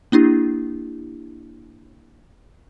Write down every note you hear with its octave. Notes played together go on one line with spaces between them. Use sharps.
A#3 D4 E4 G4